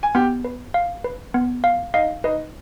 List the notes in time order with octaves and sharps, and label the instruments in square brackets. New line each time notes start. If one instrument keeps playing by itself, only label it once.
[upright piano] G#5
[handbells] B3 [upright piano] G4 G5
[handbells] B4
F5
B4
B3
F5
[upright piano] D#4 D#5 [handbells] F5
[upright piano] D#4 D#5 [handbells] B4